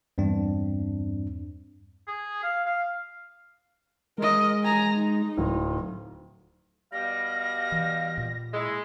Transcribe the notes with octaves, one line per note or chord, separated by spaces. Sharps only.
E2 G2 C4 D4
G#4
F5
F5
G#3 A#4 D#5
G#5 A#5
D#4
D1
B2 G3 F5 A#6
E3
A#2
G#3 E4